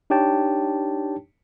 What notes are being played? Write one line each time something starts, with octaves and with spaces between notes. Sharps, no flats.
D4 D#4 G4 C#5 G5 A5